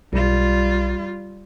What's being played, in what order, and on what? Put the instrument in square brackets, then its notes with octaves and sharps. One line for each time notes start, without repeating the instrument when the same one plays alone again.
[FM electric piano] B1 [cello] G3 F4